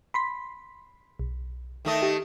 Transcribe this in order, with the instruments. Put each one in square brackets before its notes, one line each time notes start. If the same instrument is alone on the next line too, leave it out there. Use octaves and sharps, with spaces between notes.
[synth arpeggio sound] B5 C6 B6
B1
[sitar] D#3 A3 D#5
[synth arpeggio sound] G4